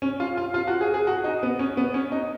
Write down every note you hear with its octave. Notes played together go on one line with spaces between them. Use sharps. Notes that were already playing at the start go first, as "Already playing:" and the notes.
C#4
F4
F4
F4
F#4
G#4
G#4
F#4
D#4
B3
C#4
B3
C#4
D#4